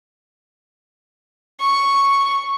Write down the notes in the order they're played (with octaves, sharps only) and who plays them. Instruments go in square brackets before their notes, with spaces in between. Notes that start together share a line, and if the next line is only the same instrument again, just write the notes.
[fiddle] C#6